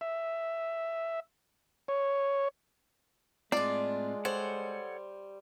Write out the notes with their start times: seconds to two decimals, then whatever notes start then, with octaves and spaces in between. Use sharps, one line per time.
0.01 E5
1.88 C#5
3.52 A2 G#3 C4 D4 F4 D5
4.25 G3 A4 C5 C#5 F#5